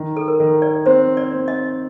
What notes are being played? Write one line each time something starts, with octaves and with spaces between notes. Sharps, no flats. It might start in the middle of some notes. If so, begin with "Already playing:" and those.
Already playing: D#3
A4
A#4
D#3 A4
D5
C4 C5
D5
C4
D#5